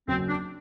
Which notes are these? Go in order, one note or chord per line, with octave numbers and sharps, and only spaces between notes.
F#1 F#2 F#3 C4
D4